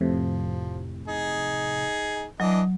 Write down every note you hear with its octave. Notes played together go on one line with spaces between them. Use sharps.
F2 A2 C3 F3
D#4 G#4
E3 F#3 D4 D#5